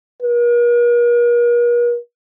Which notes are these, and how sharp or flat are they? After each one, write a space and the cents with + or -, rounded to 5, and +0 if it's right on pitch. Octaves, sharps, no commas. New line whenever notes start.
A#4 +45